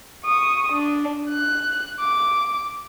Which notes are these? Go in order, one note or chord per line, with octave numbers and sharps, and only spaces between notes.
C#6 D#6
D4
F#6
D6